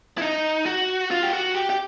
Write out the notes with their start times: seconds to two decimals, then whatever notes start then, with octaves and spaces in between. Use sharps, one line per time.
0.18 E4
0.22 D#4
0.66 F#4
1.11 F4
1.23 G4
1.33 F#4
1.55 G4
1.70 G4